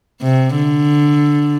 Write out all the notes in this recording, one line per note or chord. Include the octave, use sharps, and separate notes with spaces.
C3
D3